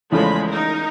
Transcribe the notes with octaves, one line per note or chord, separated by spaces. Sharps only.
E2 C#3 F3 G#3 A3 B5
D#4 A#4